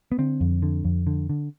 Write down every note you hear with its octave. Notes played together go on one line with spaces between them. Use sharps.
B3
D3 C4
F2
D3
F2
D3
D3